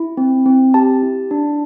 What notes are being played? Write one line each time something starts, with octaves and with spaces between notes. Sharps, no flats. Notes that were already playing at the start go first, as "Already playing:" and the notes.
Already playing: E4
C4
C4
G4 A5
E4
D4